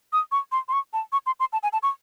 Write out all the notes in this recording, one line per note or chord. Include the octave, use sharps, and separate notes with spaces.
D#6
C#6
C6
C6
C#6
A5
C#6
C6
C6
A5
G#5
A5
C#6